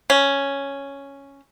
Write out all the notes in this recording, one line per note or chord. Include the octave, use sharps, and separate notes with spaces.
C#4